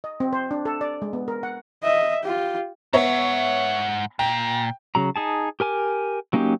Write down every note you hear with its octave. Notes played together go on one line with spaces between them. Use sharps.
D#5
C4
C5
D4
A4
D5
G#3
B3
A#4
F#5
D#5 E5
F4 G4
G#2 B3 C#5 E5 F#5
A#2 G5
C#3 F#3 A#5
D#4 G#4 A5
G4 A#4 G#5 D6
F#3 A#3 C#4 D#4 G4